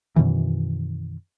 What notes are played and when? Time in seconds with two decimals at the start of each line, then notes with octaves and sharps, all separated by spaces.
0.16 F#2 B2 D#3 E3